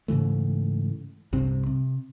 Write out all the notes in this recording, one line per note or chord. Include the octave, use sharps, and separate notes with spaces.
G#2 C#3 E3 A3
C2 G2 C3 C4
C3